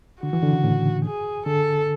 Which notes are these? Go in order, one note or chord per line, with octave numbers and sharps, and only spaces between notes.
D3 F#4
E3
D3
C#3
A2
G#4
D3 A4